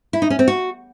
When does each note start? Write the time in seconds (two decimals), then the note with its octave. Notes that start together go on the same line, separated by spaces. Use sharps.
0.13 E4
0.22 D#4
0.30 C#4
0.39 C4
0.48 F#4